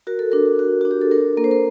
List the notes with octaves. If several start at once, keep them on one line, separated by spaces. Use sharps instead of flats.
F#4 A#4
A4
D4 A#4
F#4
D4 F#4
G4
A4
D4 A#4
A#3 A#4
C5
A#4